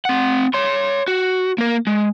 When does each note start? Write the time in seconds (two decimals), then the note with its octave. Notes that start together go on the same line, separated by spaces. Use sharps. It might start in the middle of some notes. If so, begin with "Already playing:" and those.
0.05 C4 F#5
0.54 C#5 C6
1.08 F#4
1.58 A#3 A#4
1.87 G#3